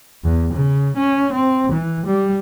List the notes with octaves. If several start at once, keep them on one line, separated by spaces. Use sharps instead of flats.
E2
C#3
C#4
C4
E3
G3